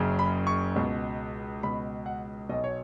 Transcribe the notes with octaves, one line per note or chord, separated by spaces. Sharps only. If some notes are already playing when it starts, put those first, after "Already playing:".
Already playing: F#1 F#2 C#3
B5
C#6
C#2 B2
C#2 B2 B5
F#5
B1 B2 D#5
C#5